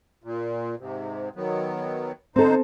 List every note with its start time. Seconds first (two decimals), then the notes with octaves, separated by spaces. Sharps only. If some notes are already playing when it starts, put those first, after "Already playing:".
0.24 A#2
0.79 G#2 C3
1.36 D#3 F#3 B3
2.36 D3 C4 D#4 A4 C5